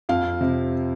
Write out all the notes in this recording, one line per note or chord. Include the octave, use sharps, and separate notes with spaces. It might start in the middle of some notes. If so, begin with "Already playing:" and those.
F2 F5
C3